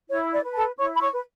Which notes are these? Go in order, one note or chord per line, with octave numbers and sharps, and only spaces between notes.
E4 C#5
D5
B4
A4 A5
E4 C#5 C#6
B5
C#5 C#6
B4